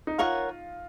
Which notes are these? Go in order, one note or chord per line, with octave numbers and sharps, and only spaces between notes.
D#4
F4 A#4 C#5 F#5